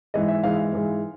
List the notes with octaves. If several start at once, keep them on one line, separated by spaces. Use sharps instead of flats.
G#2 E3 G#3 D#5
E5
G#2 E3 G#3 F5
F5
G#2 E3 G#3